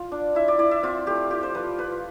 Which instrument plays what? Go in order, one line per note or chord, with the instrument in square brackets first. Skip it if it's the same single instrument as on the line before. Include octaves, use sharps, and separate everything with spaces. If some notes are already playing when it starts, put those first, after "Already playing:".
Already playing: [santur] F4 F5
D4
E4 E5
D5
E4 D5
E5
C4 F4
A3 G4
F4 G4
C5
F3 B4
F4 B4